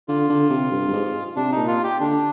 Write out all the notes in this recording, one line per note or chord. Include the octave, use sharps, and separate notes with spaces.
D3 F4
D3
C3
G2
G2
G#2
C3 D4
A#2 D#4
F4
G4
D3 D4